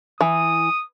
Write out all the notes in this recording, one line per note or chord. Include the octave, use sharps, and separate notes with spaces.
E3 D#6